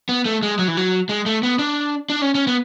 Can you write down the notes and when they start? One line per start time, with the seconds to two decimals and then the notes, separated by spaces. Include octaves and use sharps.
0.09 B3
0.25 A3
0.43 G#3
0.59 F#3
0.68 E3
0.77 F#3
1.09 G#3
1.26 A3
1.43 B3
1.59 D4
2.10 D4
2.22 C#4
2.35 C#4
2.47 B3